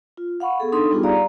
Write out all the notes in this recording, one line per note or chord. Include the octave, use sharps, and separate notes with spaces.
F4
F5 F#5 B5 C#6
B3 G#4 A4
D4 D#4 A4 C6
G3 B3 D#4 F4 G4 G#4
D5 F5 A#5